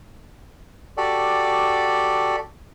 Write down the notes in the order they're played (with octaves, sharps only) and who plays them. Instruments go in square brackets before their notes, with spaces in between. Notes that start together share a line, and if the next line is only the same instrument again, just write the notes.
[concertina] F#4 G4 A4 D5